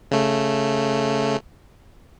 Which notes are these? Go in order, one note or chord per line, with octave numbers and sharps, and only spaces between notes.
C#3 A3